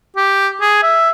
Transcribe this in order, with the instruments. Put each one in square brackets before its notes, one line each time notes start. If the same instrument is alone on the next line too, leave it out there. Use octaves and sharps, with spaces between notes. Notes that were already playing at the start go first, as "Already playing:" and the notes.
[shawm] G4
G#4
E5